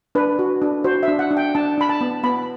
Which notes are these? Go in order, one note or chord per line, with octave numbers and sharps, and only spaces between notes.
D4 B4
F#4
D4
F#4 C5
E5
D4
F#5
D4
G5
D4 A5
D4 B5
A5
B3
B3 B5